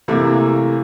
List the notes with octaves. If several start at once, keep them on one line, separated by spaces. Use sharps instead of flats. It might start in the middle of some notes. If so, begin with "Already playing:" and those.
C3 E3 A3 A#3